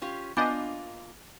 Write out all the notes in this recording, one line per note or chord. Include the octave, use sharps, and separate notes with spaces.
C#4 F4 G4
A#3 B3 D4 F4 D#5 G#5 D6 G6